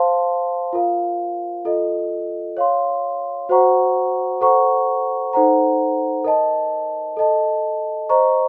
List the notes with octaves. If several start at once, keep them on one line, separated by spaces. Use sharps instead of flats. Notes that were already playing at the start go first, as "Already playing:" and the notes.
Already playing: C5 F5 A5 C6
F4 A#4 F5
F4 A4 D#5
C#5 F5 C6
F#4 C5 F#5 A#5 C#6
A4 C5 F#5 A#5 C#6
D#4 A4 C5 F#5 A#5
A#4 D#5 A5
A4 D#5 A5
C5 D#5 A#5 C#6